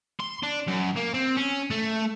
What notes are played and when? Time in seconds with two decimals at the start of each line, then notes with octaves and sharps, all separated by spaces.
0.20 C6
0.43 D4
0.68 F#2
0.96 A#3
1.14 C4
1.37 C#4
1.71 A3